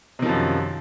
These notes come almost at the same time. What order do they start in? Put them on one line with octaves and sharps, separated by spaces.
C3 D#3 F3 F#2